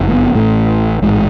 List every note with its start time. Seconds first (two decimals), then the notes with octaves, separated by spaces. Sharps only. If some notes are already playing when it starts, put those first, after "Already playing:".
Already playing: F#1 F2 C#3
0.08 A3
0.13 B3
0.35 A1 A2 A3
1.02 A1 G#2 G#3